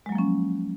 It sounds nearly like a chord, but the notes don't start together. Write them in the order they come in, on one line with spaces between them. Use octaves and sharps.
G#3 F#3 A#3 F3 C#4